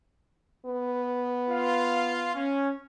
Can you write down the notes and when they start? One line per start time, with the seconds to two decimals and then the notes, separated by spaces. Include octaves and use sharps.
0.66 B3
1.50 F4 F5
2.34 C#4